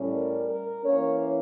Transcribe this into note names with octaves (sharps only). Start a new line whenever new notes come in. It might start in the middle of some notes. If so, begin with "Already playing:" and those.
Already playing: A2 G3 C#4
A#4
A#4
E3 A#3 C#4 C#5